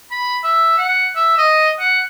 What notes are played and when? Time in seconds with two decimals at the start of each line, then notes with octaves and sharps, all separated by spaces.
0.11 B5
0.44 E5
0.78 F#5
1.16 E5
1.38 D#5
1.79 F#5